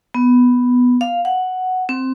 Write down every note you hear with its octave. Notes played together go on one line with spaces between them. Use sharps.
B3
F5
F#5
C4